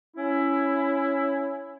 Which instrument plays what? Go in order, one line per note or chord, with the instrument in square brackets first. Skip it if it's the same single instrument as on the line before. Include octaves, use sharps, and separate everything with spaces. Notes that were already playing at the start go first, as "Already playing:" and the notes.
[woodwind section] C#4 E4